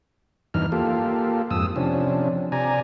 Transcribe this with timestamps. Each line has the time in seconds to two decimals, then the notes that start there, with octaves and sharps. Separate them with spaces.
0.54 E2 G2 E3 D#4 F6
0.72 A#3 F4 G4 A4
1.51 F2 G#2 D#6 E6
1.76 C3 F3 C#4 D4
2.52 C3 D5 G#5 A#5